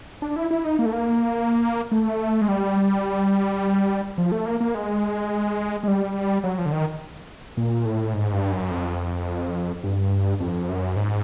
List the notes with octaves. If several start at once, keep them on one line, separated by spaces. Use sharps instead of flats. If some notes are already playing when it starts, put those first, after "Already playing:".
D4
E4
E4
D#4
A#3
A3
A#3
A3
G#3
G3
F3
A3
A#3
A#3
G#3
G#3
G3
F#3
F3
D3
D#3
A#2
A2
G#2
G2
F#2
F2
G2
F2
F#2
G#2